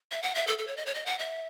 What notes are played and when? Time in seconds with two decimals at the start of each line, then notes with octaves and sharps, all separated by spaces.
0.11 E5
0.23 F#5
0.35 E5
0.47 A4
0.58 A4
0.67 C#5
0.77 D#5
0.86 C#5
0.95 D#5
1.06 F#5
1.19 E5